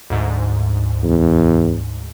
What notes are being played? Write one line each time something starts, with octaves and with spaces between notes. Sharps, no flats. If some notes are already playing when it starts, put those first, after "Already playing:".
D2 G#2
E2